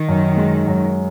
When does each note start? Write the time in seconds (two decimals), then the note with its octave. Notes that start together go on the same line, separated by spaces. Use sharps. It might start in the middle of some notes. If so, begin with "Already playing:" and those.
Already playing: D#3
0.08 F#2
0.37 G#3
0.67 F#2